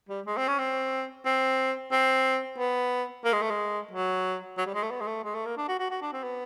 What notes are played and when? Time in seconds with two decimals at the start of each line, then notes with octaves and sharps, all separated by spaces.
0.09 G3
0.26 G#3
0.37 C4
0.48 C#4
0.58 C4
1.25 C4
1.92 C4
2.58 B3
3.25 A#3
3.33 G#3
3.42 A3
3.50 G#3
3.91 F#3
4.58 F#3
4.66 G3
4.75 G#3
4.83 A3
4.91 B3
5.01 G#3
5.07 A3
5.24 G#3
5.35 A3
5.46 A#3
5.57 D4
5.68 F#4
5.79 F#4
5.90 F#4
6.02 D4
6.12 C4
6.23 B3